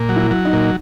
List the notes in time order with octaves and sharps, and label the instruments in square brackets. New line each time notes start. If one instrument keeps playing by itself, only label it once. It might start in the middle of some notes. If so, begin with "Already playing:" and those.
Already playing: [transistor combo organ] A#2
F#3
[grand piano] E4
[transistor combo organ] F#3
[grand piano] D#4
[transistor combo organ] A#2